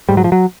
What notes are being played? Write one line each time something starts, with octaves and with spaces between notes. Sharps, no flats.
G#2 G3
F#3
F3
F#3